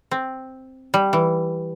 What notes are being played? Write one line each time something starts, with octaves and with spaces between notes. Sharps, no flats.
C4
G3
E3